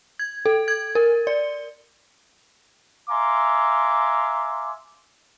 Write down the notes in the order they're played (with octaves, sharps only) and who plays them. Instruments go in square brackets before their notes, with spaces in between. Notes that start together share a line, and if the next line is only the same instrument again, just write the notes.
[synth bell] G#6
A4
G#6
A#4
D5
[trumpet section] E5 F5 G#5 A#5 C6 D6